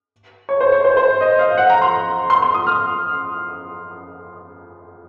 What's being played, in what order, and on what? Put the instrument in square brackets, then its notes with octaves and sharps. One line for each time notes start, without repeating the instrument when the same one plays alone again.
[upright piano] C#5
C5
C#5
C5
C5
D#5
F5
F#5
A#5
C6
C6
C6
D#6
F6